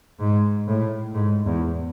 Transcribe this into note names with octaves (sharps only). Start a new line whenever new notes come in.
G#2
A2
G#2
E2